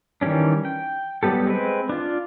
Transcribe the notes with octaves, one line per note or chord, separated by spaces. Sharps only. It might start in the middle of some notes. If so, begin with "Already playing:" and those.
D#3 E3 G3 C#4 D4
G5
F#3 G3 B3 G4 A4
G#3 C4 B4
D4 F4